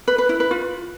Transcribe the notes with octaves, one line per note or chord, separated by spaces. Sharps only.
B4
B4
E4
B4
F4